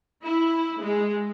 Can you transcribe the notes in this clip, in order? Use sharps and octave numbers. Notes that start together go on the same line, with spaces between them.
E4
G#3